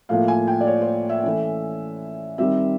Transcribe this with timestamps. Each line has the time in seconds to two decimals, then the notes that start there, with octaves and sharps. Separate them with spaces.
0.09 A2 F3 A#3 F5
0.28 G#5
0.47 G5
0.61 D5
0.67 C#5
0.81 C5
1.09 E5
1.23 E3 A3 C#4
2.38 D#3 G3 C4 E5